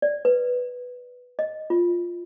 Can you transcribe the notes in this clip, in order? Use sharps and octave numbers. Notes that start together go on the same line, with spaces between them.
D5
B4
D#5
F4